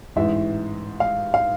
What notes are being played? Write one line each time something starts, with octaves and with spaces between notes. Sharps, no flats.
A1 G#2 E3 E5
F5
F5